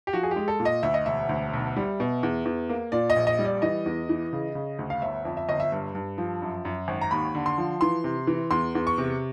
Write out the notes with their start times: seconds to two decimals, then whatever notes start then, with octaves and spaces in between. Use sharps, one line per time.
0.07 G4
0.13 F3 F#4
0.23 G#4
0.31 G4
0.36 G#3
0.48 A4
0.60 A#2
0.65 D#5
0.83 D2 E5
0.94 D#5
1.06 E1 E5
1.29 D2
1.53 B1
1.76 G3
2.00 B2
2.23 E2
2.45 E2
2.70 A#3
2.92 A#2 D5
3.10 D#5
3.16 A#1
3.27 D#5
3.39 G3
3.45 D5
3.62 E3 D#5
3.86 E2
4.09 E3
4.33 C#3
4.55 C#3
4.79 D2
4.90 F5
5.02 G1 E5
5.25 F2
5.37 E5
5.49 G1 D#5
5.60 E5
5.72 G2
5.95 G2
6.18 F3
6.42 F#2
6.65 F#2
6.88 G#1
7.01 A#5
7.11 D#2 B5
7.35 D3
7.46 C6
7.58 F3
7.81 E3 C6
8.04 C3
8.27 E3
8.51 E2 C6
8.75 E2
8.87 C#6
8.98 C3